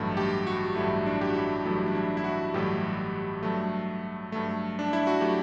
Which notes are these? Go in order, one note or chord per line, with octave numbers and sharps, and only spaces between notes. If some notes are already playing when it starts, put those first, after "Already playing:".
Already playing: A1 G2 F#3 A3
G4
F#4
A1 G2 F#3 A3 E4
D4
G4
F#4
E4
A1 G2 F#3 A3
D4
E4
E4
F#4
A1 G2 F#3 A3 G4
G2 F#3 A3
G2 F#3 A3
D4
E4
F#4
F#3 A3 G4